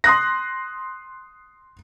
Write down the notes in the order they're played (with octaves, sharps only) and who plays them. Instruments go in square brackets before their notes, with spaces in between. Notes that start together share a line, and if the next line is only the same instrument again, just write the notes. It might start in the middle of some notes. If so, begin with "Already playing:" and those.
[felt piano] C6 D#6 F#6 A#6